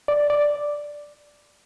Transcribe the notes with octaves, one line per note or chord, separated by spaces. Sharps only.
D5
D5